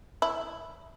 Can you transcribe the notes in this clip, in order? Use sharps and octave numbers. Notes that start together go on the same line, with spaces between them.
E4